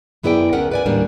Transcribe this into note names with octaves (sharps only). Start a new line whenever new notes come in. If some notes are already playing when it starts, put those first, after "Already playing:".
F#2 B3 E4 G#4 D5 G5
D2 B3 C#4 A#4 F#5
B4 D5 G#5
D#2 A2 G3 A3 A#3 D4